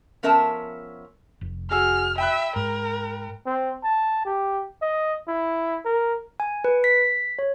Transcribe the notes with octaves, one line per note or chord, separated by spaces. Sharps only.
F3 B3 C#4 A#4 E5 A5
F1
F#4 G#4 E6 F6
E5 G5 B5 F#6
G#2 A#4
C4
A5
G4
D#5
E4
A#4
G#5
B4
B6
C#5